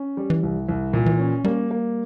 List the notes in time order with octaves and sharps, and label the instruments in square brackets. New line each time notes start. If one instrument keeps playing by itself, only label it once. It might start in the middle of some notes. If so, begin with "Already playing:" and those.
Already playing: [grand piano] C#4
G3
[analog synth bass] E3
[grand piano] C2
C2
A#2
[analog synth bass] E3
[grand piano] C#4
[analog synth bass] G3 [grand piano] A#3
[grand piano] A#3